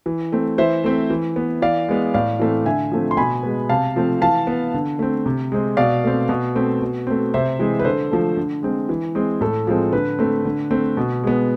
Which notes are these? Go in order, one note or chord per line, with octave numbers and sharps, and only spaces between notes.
E3
A3 C4
E3 C5 E5
A3 C4
E3
B3
E3 D5 F5
G#3 B3
A2 D5 F5
E3 A3 C4
D3 E5 G#5
F3 A3 C4
C6
B2 G#5 B5
G#3 B3
C3 F5 A5
F3 A3 C4
E3 F5 A5
B3
D3
A3 C4
C3
G#3 C4
B2 D5 F5
A3 C4
B2
A3 C4
B2
A3 C4
C3 C5 E5
E3 G#3 C4
B4
D3 A4 C5
F3 A3
D3
G#3 C4
E3
G#3 C4
A2 A4
F3 G#3 C4
D3 B4
A3 C4
D3
A3 C4
B2
G#3 B3